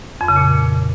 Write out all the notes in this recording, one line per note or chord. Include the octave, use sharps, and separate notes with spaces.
F2
C#3
A#2